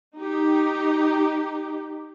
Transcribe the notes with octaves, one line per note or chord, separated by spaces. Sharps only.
D#4 G4